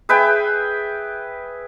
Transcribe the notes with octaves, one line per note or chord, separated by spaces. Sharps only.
G#4 B4 E5 G5